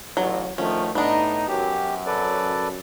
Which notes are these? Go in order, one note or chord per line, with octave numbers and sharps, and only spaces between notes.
A1 F#3
D2 D#3 F3 A3 C#4
A2 B3 D4 D#4
F#2 G4
A4 B4 D5